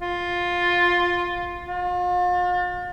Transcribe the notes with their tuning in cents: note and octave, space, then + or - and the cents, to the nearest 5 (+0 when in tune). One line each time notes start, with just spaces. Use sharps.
F4 +10
F4 +40